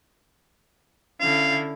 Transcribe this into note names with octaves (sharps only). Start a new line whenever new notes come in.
D3 C#4 E4 F5